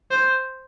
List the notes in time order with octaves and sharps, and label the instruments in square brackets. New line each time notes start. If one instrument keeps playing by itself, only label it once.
[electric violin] C5